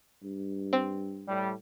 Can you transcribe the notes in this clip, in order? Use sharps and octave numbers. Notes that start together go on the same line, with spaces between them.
G2
C4
A2 G3